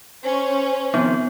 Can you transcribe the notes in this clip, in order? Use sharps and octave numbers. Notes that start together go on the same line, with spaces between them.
C#4 C5 C#5
C3 D#3 F3 B3